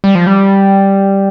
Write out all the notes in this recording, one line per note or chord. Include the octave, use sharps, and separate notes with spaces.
G3
F3
G3